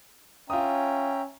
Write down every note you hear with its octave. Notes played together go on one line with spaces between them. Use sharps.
C#4 F4 E5 G5 A#5 D#6